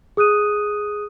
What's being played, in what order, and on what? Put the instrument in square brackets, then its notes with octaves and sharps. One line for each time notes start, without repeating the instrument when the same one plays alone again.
[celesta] G#4 D#6 F#6 D#7